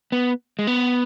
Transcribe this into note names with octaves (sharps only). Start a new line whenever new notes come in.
B3
G#3
B3